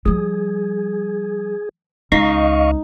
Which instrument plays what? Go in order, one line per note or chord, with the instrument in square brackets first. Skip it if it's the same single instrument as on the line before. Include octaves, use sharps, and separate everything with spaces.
[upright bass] F3 G3 [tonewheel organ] G#4
[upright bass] C#2 [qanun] D#4 [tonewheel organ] D#5 F5 C#6